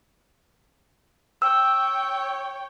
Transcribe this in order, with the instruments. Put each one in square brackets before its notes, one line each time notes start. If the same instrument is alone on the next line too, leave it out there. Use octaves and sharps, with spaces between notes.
[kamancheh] C#5 G5 [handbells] E6